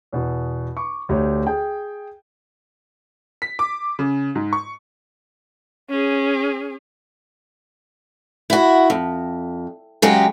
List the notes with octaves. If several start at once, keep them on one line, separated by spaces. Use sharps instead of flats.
E2 B2 B3
C#6 D6
D2 G4 C#5
G#4 G5
B6
D6
C#3
G#2
C#6
C#4 G#4
E4 F#4
F2
C#3 F#3 G#3 F#4 G4